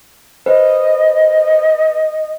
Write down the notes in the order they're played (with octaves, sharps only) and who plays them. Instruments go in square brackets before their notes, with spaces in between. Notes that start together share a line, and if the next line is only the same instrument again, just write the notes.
[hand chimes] B4 [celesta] C5 [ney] D#5